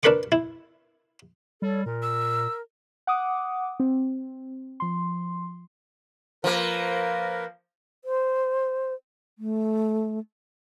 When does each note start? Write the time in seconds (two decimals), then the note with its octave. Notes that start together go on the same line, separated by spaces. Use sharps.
0.03 D4 A#4 B4 B5 C#6 D6
0.32 E4
1.62 G3 A4 C#5
1.86 A#2 A#4
2.03 E6
3.07 F#5 D6 D#6
3.80 C4
4.80 F3 C6
6.44 F3 A#3 A#4 B4
8.05 C5
9.39 A3